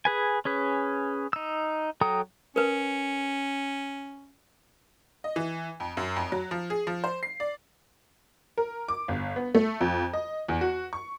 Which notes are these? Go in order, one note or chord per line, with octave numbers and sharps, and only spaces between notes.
G#4 B4 G#5
C#4 G#4 B4
D#4 E6
F#3 A4 G5 A#5 D#6
C#4 A#4 B4
D#5
E3
F2
F#2
F2
F#3
F3
G#4
F3
C5
C7
D5
A#4
D6
G1
B3
A3
F2
D#5
E2
F#4
C#6